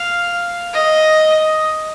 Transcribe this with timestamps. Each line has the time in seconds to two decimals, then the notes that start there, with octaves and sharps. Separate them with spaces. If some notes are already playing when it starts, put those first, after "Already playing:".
Already playing: F5
0.74 D#5